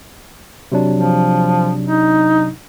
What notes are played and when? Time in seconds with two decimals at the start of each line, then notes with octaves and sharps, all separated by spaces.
0.72 C3 F#3 D4
0.95 F3
1.84 D#4